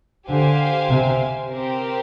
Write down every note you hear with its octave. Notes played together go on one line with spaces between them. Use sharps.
D3 G4 C5 F5 G#5
C3
C4 G4 A#4